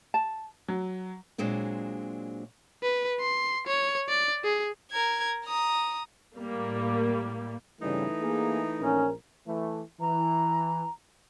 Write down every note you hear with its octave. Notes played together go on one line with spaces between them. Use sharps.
A5
F#3
A#2 F#3 G#3 C4 D4
B4
C6
C#5
D5
G#4
A#4 G#6
A#5 D#6
A2 G3 A#3
G2 C#3 E3 G3 A3 D#4
A#3 G#4
A#1 C#4 A#4
E3 A3
E3 A#5